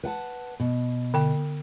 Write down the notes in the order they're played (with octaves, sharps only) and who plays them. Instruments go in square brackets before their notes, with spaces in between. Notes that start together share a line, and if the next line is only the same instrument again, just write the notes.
[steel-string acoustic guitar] B4 F#5 A5
B2
[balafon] D3 G5